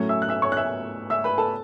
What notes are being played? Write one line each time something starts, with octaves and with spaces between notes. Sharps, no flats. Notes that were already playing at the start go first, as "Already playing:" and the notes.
Already playing: A2 F#3 A3 C#4 C#5 C#6
E5 E6
F#6
E5 E6
C#5 C#6
F#6
E5 E6
E5 E6
B4 B5
A4 A5